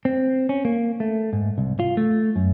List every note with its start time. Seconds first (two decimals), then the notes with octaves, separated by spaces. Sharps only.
0.05 C4
0.49 C#4
0.65 A#3
1.00 A3
1.33 G#2
1.58 C2
1.80 F4
1.97 A3
2.36 F#2